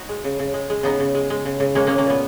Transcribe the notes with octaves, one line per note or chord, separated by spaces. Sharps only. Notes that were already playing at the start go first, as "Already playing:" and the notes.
Already playing: D#4 F#4
G#3
C#3
C#3
G#3
G#3
C#3 B3 D#4
C#3
G#3
G#3
C#3
C#3
G#3 A#3 C#4
G#3 A#3 C#4
A#3 C#4
A#2 B3